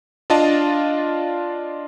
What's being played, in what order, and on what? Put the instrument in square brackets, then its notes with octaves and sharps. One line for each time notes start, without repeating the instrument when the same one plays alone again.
[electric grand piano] D4 F4 D5 D#5 F5 A5